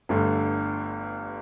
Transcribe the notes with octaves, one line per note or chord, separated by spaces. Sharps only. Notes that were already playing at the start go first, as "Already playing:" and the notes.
G1 G2 D3 A3